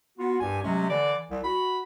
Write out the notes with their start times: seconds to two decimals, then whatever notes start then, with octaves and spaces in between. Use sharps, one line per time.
0.18 B3 F4 F#4
0.40 C2 G2 G4 G#5
0.63 C3 F#3 G#3 A3 C#4
0.89 D3 E3 D5
1.31 C2
1.44 F#4 B5